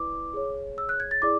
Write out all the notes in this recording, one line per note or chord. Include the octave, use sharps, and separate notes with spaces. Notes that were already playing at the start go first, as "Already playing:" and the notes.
Already playing: E4 B4 D5 D6
G#4 C#5
E6
F#6
G#6
A6
E4 G#4 D5 D6